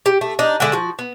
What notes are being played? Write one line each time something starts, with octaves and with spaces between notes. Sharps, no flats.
G4
A3
D4 D#4
D3 G#3 E5 F#5
F3 F#4
B3